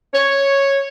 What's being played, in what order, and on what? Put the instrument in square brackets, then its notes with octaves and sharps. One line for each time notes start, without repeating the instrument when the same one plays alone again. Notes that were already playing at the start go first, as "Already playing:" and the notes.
[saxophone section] C#5